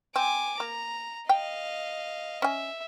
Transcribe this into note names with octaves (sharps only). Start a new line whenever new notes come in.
C4 G#5 D6
A#3 A#5
D#5 F5 G5
C#4 E5 G#5